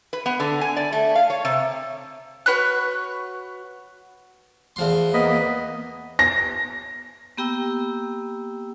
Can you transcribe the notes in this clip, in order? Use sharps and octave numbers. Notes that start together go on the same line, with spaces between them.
B4
B3
D3
G#5
D5
A3
F5
C#5
C3
F#4 B4 C#5 F#6
E2 F3 C6
A#3 B3 D#5 B5
A#6
A#3 B3 G4 G5 E6